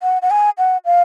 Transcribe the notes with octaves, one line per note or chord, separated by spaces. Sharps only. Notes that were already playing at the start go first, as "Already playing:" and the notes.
F#5
F#5
G#5
F#5
F5